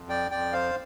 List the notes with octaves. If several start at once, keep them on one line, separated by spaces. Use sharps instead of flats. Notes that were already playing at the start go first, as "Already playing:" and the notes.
Already playing: F2
D5 G5
F2 D5 G5
C5 F5